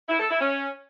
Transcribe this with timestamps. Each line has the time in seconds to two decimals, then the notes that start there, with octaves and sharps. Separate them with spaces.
0.09 E4
0.19 A4
0.30 E4
0.41 C#4